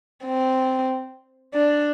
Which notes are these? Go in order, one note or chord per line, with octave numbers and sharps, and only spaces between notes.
C4
D4